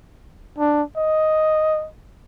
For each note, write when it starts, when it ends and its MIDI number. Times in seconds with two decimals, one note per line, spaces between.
0.58 0.82 62
0.97 1.87 75